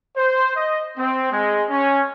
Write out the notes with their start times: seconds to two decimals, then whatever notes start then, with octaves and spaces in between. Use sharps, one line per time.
0.16 C5
0.55 D#5
0.97 C4
1.31 G#3
1.69 C#4